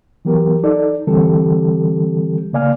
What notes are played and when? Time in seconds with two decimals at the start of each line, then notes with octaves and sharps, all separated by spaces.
0.25 E3 F#3 B3 G4 A#4
0.63 D#4 A4 D5
1.07 D3 E3 G3 C4 G4 A4
2.53 C#3 A#3 D5 F5 G#5 F6